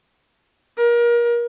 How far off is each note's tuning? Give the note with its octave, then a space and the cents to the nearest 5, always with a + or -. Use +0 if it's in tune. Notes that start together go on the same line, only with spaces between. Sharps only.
A#4 +30